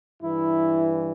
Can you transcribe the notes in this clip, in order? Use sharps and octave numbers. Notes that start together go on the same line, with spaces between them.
G2 E3 E4